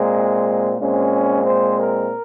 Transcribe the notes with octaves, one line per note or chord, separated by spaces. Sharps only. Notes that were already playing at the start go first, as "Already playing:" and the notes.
Already playing: A#2 G#3 C4
A#2 G#3 C4 C#4
C5
A#4